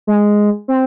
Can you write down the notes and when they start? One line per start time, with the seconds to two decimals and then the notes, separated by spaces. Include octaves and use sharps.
0.07 G#3
0.68 C4